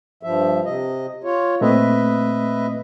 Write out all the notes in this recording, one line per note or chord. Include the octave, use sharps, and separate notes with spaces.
G2 F3 E5
C3 D#5
F4 C#5
A#2 A3 C4 B4 D#5 E5